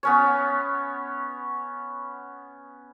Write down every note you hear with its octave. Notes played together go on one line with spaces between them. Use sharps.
B3 C#4 C#5